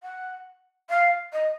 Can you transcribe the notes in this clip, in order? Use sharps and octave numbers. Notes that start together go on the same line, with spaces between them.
F#5
F5
D#5